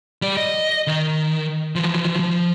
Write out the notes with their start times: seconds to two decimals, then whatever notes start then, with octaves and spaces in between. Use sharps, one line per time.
0.22 G3 D5
0.37 D#5
0.87 D#3
1.75 E3 F3
2.19 F3